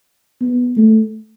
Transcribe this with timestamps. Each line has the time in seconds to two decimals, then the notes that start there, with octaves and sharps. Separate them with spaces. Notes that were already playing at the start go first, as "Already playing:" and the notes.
0.42 B3
0.77 A3